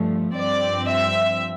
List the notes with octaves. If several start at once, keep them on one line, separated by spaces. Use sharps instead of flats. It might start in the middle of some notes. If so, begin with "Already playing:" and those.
Already playing: G2 F3 A3
G2 F3 C4 D5
E5